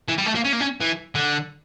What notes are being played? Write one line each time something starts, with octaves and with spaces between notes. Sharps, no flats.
E3
G3
A3
A#3
C#4
A#3
C#4
E3
D3